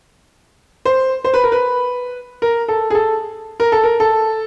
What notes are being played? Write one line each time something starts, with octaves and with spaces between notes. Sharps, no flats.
C5
C5
B4
A#4
B4
A#4
A4
G#4
A4
A#4
A4
A#4
A4